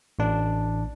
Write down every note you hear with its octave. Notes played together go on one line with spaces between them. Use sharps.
A1 D4